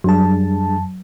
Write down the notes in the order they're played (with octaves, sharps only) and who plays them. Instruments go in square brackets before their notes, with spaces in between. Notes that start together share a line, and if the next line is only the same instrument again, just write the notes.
[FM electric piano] F#2 A5 [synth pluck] F#3 [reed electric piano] G3 D4 G#4